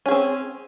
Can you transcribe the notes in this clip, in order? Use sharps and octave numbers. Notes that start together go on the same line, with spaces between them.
C4 C#4 G#4